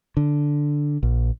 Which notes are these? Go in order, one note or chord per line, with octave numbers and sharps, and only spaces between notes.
D3
A#1